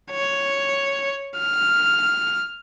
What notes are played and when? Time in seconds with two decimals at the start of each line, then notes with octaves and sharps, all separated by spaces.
0.12 C#5
1.38 F6